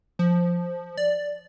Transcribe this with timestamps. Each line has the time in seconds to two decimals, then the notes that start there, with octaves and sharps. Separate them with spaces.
0.19 F3
0.97 D5